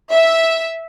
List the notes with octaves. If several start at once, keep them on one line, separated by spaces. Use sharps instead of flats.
E5